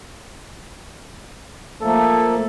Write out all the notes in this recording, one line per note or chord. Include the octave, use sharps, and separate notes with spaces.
F3 A3 A#3 A4